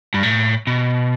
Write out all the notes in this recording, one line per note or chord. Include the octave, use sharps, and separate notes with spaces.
G2
A2
B2